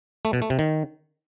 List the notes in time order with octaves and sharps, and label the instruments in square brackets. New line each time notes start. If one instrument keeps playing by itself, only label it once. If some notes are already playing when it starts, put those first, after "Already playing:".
[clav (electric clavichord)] A3
B2
A3
C3
D#3